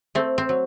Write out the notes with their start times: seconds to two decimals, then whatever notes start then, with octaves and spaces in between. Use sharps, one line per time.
0.15 A3 C4
0.38 C4
0.49 F#3